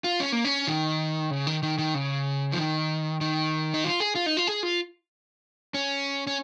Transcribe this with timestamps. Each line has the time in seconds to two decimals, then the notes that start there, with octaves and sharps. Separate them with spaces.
0.04 F4
0.20 C#4
0.32 A#3
0.45 C#4
0.68 D#3
1.31 C#3
1.47 D#3
1.63 D#3
1.78 D#3
1.94 C#3
2.52 F3
2.58 D#3
3.21 D#3
3.74 D#4
3.84 F4
4.00 G#4
4.15 F4
4.26 D#4
4.37 F4
4.47 G#4
4.63 F4
5.74 C#4
6.27 C#4